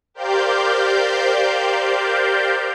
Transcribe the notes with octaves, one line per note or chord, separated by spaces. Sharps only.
G4 A#4 C5 D5 F5 G6